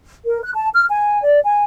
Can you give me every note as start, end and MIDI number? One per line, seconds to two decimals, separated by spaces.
0.25 0.38 70
0.43 0.50 90
0.54 0.69 81
0.73 0.85 89
0.90 1.21 80
1.23 1.39 74
1.45 1.64 80